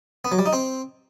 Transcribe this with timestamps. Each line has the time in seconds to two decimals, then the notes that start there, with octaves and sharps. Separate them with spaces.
0.25 B3
0.32 F#3
0.39 G3
0.46 D#4
0.53 C4